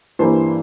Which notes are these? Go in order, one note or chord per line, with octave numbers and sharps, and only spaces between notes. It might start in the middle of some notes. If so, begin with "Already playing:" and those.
G2 E3 A#3 C5